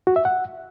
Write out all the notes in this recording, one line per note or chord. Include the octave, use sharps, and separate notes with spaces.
F#4
E5
F#5